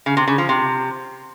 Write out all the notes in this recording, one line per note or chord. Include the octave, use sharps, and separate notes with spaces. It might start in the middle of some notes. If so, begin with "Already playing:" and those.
C#3
C3
C#3
F3
C3